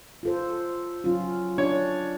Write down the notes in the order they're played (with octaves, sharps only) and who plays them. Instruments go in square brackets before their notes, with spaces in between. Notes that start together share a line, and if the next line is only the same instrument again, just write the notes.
[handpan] F4 A4 C5
F#3 C#4 F4
[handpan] D4 [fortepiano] C#5